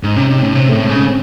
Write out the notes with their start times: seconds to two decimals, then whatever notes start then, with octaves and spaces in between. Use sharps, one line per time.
0.03 G#2 D#4
0.16 C3 C#4
0.30 C3 D#4
0.42 A2 C#4
0.55 C3 C4
0.69 A3
0.73 A2
0.81 G#3
0.90 C#3 C#4
1.07 C4